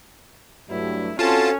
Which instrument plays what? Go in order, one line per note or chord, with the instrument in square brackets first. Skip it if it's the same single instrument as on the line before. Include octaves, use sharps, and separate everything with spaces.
[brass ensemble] G2 F#3 A3 [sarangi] E4
[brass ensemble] C4 F#4 A4 [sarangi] C#4 [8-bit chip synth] F4 A5